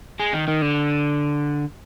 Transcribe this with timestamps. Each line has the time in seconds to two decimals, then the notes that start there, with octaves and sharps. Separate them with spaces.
0.20 G#3
0.33 D#3
0.48 D#3
0.62 D3